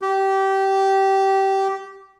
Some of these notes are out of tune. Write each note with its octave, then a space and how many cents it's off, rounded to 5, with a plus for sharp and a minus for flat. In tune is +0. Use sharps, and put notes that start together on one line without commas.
G4 -20